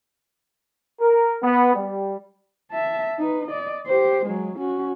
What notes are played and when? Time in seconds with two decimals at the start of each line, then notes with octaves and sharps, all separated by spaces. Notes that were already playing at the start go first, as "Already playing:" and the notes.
1.00 A#4
1.43 B3
1.75 G3
2.71 E5 A5
3.19 D#4 B4
3.47 D5 D#5
3.86 G4 C5
4.26 F#3 G#3
4.58 C#4 F#4